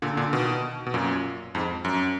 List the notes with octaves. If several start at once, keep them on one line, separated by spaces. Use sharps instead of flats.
A#2 D3
A#2 D3
B2 D#3
B2
F#2 A#2
F2 G#2
F#2